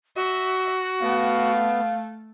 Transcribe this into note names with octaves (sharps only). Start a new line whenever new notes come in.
F#4 E5
A3 B3 F5